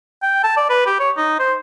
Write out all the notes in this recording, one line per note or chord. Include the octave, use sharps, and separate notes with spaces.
G5
A5
D5
B4
G4
C#5
D#4
C5